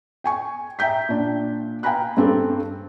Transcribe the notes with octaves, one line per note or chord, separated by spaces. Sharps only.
G5 G#5 C#6
E5 G5 A#5 G6 B6
A#2 D4
F5 G5 G#5 A#5 B5 F#6
G2 C4 G4 A4